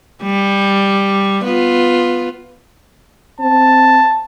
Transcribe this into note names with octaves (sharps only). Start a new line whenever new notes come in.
G3
B3 F4
C4 A5